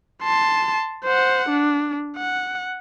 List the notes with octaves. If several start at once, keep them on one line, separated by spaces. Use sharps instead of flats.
A5 C6
C5 F#5
D4
F#5